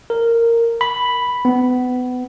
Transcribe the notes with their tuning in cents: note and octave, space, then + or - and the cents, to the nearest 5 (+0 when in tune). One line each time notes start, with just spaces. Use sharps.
A#4 -10
B5 +0
B3 +25